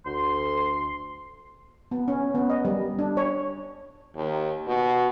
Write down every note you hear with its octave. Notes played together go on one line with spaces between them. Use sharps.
D2 C6
B3
C#4
B3
D#5
G3
D4
C#5
D#2
B2